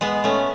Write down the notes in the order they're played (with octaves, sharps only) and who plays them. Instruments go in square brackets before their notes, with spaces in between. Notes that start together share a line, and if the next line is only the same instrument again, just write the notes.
[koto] G#3 B3
A3 C#4